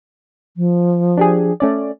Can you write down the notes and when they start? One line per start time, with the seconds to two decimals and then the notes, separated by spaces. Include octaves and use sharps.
0.57 F3
1.17 D4 G4 G#4
1.60 A3 C#4 D5